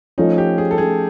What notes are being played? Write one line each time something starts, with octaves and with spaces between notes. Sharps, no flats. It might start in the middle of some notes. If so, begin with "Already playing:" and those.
F3 A3 C#4 D#4 F4
G4
G#4
A4
F3 A3 C#4 F4 G#4